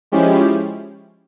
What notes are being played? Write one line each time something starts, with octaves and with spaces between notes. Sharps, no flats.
F3 G#3 C#4 E4 G4